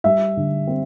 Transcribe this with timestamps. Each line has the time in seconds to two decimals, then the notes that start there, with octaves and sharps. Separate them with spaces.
0.04 G3 E5
0.37 D3
0.67 C4